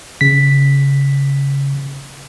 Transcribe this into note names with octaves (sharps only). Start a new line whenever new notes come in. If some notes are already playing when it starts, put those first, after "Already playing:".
C#3 B6